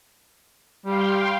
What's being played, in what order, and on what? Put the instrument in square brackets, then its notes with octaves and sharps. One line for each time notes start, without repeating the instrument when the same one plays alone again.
[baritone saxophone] G3 [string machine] F5 G5 C6